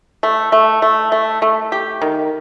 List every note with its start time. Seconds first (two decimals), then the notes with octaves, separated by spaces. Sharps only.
0.23 A3
0.52 A3
0.82 A3
1.12 A3
1.42 A3
1.72 G4
2.02 D#3